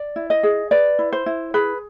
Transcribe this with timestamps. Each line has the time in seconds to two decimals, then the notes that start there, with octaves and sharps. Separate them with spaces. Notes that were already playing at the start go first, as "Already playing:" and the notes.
Already playing: D5
0.16 E4
0.30 D#5
0.43 G#4
0.71 B4 D5
0.99 E4
1.12 C5
1.26 E4
1.54 G#4 B4